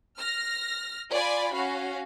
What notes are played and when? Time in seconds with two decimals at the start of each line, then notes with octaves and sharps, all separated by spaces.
0.17 F6 A#6
1.12 F4 D5 G#5 B5
1.54 C#4 F#4 F5